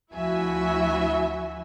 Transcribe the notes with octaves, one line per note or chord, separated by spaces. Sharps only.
D2 F3 E4 F#4 E5 G#5